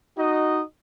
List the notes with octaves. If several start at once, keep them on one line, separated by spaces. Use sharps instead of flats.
D#4 F#4 D#5